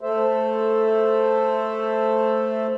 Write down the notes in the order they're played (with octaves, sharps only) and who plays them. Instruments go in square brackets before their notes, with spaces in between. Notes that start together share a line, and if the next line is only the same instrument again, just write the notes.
[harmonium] A3 A4 C5 E5